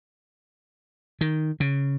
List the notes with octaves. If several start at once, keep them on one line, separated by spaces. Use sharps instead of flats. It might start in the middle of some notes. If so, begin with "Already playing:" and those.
D#3
C#3